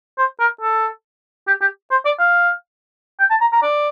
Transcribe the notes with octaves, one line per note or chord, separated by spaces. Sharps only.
C5
A#4
A4
G4
G4
C5
D5
F5
G5
A5
A#5
A#5
D5